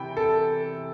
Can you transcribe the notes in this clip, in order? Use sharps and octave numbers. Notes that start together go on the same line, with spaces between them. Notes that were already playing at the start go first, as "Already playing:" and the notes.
Already playing: C3 E3 G5 B5
A4